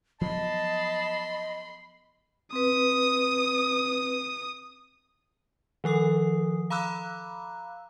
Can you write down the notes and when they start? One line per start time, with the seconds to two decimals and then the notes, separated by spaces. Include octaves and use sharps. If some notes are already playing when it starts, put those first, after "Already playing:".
0.21 F3 F#3 B3 D#5 A5 B5 C6
2.53 C4 B4 D#6
5.84 D#3 F3 A4 D#6
6.70 F5 A#5 B5 D6 E6 F#6